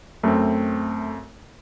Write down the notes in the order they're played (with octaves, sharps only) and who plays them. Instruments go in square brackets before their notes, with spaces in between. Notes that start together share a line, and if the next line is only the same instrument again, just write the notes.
[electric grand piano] F#2 C4 [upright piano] A3